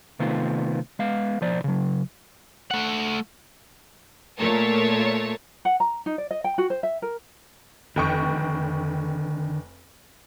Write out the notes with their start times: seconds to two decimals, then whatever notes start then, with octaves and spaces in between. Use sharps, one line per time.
0.19 C3 D#3 A3 B3 C4 F4
0.99 G#3 B3 F5
1.41 B1 F3 C5 D5
1.64 C#3 F#3
2.71 A3 F#5
4.38 A#2 A3 A#4 C#5 A5
5.65 F#5
5.80 A#5
6.06 D#4
6.18 D5
6.31 D#5
6.44 G5
6.58 F#4
6.70 C5
6.83 E5
7.02 A#4
7.96 F1 D3 D#3 G5 C#6